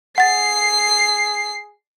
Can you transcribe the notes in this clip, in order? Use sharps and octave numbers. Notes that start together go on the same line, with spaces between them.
G#4 F#5 A6 C7